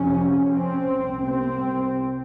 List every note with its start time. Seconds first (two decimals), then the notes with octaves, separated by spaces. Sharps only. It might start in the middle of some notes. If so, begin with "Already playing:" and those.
Already playing: F2 C3 C#4
0.49 C4
0.86 C2 C3
1.23 C4